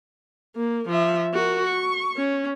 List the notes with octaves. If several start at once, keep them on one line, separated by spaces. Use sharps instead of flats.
A#3
F3 E5
F#4 A#4
C#6
C#4